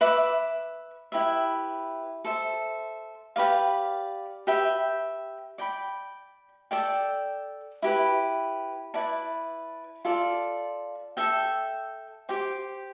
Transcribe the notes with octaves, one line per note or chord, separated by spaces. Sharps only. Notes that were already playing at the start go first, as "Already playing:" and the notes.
B4 E5 B5 D6
E4 G4 B4 E5
A4 C5 E5
G4 B4 D5 F5
G4 B4 E5 G5
D5 G5 B5
A4 D5 G5
E4 G4 B4
E4 B4 D5 A5
F4 A4 D5
A4 E5 G5
G4 C5 G5 D6